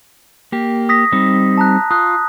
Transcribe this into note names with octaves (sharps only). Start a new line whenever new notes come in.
A#3 G4
D#6 A#6 B6
G3 C4 D#4
A5 A#5 F#6
F4 D#6 F#6